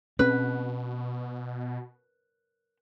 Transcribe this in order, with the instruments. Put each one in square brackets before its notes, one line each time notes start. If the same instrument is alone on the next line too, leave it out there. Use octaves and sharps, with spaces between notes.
[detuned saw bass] B2 [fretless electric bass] C4 C#4 [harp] B4